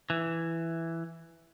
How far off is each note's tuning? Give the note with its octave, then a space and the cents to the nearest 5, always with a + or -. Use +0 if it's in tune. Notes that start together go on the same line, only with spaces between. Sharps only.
E3 +5